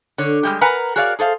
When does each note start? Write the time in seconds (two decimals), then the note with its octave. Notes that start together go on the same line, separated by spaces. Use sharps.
0.18 D3 C#5
0.43 G3 G#3 G4
0.61 A#4 B4 F#5 G#5 A#5
0.96 F#4 G#4 A#4 C#5 D5 F5
1.19 G#4 A4 C5 F5